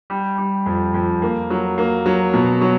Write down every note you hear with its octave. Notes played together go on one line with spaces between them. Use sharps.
G3
G3
F2
F2
A#3
F#3
A#3
F#3
B2
F#3